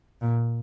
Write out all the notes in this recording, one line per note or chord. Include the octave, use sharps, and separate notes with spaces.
A#2